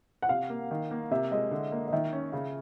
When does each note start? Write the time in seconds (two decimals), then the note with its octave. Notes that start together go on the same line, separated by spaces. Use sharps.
0.22 F#5
0.29 C3 F5
0.50 A#3
0.71 D#3
0.91 A#3
1.11 C3 E5
1.31 G#3 D#5
1.51 D3
1.72 A#3
1.88 D#5
1.92 D#3 E5
2.13 C#4
2.32 C#3 F5